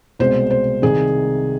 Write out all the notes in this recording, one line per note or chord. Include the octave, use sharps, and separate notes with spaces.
C2 B2 G#3 C5
C5
C2 C3 D#3 G#4